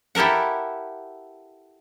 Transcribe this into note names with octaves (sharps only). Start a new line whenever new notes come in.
E4 G4 A4 A#4 F#5